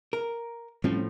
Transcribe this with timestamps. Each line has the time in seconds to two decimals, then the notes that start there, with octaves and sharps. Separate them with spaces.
0.13 A#4
0.84 A2 F3 G3 C4 C#4